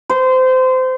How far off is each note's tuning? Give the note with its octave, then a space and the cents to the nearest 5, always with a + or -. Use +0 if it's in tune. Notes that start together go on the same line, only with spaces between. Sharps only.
C5 -25